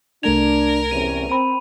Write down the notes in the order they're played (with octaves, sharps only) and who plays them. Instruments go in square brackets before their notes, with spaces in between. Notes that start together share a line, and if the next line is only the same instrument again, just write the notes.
[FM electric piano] C2 A3 G#6 [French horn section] D4 [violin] A#4 [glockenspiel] F7
[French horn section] E2 C3 C#4 [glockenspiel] D#7
[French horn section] C4 [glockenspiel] B5 D#7